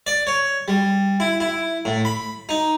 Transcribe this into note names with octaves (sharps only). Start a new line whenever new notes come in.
D5
C#5
G3
E4
E4
A2
B5
D#4